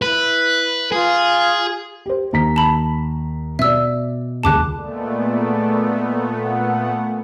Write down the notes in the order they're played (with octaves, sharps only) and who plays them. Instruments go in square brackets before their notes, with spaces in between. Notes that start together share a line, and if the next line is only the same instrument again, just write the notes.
[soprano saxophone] E4 [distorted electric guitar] B4
[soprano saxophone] F4 [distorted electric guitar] G#4
[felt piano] G4 C5
D#2 A#5 B6
[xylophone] A5 B5
[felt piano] B2 D5 [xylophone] E5 E6
[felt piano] D#1 C#2 G#4 [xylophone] A5 D6 F#6
[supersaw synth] A#2 A3 B3 [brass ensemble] G#3 A4 D5
[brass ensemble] F#5